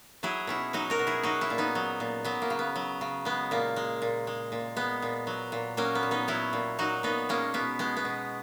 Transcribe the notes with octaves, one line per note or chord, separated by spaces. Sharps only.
F#3 E4 G#4
B2 C#4 E4
F#3 D#4 F#4
F#4 A#4
B2
E4 G#4
F#3 D#4 F#4
C#4 E4
A#2
B3 D#4
F#3
A#2
F#3 B3
A#3
C#3
B3
F#3
C#3
G#3 B3
A#2 A#3
G#3
A#2
G#3
A#2
G#3 B3
A#2
F#3
A#2
F#3 A#3 C#4
B3
A#2
B3 D#4
F#3 C#4 E4
A#2
F#3 D#4 F#4
A#2 B3 D#4
G#3 A#3 C#4
B2 B3
G#3 B3
B3
B2